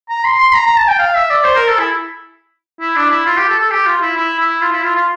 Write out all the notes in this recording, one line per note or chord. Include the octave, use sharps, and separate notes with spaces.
A#5
C6
C6
A#5
A#5
A5
G5
F5
E5
D5
C5
A#4
A4
E4
E4
D4
E4
F4
G4
A4
A4
G4
F4
E4
E4
E4
F4
E4
F4
F4